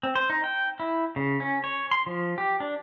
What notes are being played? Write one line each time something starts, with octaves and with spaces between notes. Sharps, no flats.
C4
C5
D#4
G5
E4
C#3
C#4
C#5
C6
F3
G4
D4